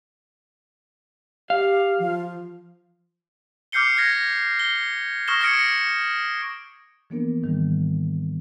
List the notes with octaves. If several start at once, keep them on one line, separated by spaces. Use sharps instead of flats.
G4 F5
F3
D6 F6 G6 C7 C#7 G7
F6 G#6 A#6
G7
C#6 D#6 F6 A#6 E7 G7
D#6 F6 G#6 A#6 C#7 D7
C#7
E3 F3 A#3 B3 D4 A#4
G#2 D#3 G3